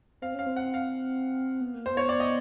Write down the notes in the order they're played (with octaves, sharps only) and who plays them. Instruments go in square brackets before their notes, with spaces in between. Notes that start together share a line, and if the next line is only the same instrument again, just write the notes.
[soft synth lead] C4 [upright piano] F5
[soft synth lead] C#4 [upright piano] F5
[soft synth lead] C4
[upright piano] F#5
F5
[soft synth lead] B3
A#3
[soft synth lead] B3 [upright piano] C5
[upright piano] C#5
D5
D#5